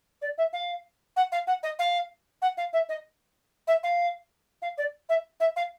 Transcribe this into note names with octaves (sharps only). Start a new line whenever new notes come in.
D5
E5
F5
F#5
F5
F#5
D#5
F5
F#5
F5
E5
D#5
E5
F5
F5
D5
E5
E5
F5